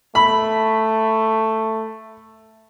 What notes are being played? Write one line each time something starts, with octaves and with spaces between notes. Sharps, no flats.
A3 B5